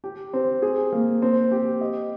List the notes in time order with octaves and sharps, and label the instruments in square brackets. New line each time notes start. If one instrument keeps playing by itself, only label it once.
[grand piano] G4
C4
G#4
A#3
C4
G4
D#5